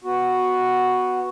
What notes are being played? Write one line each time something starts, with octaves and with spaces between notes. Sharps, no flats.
B3 F#4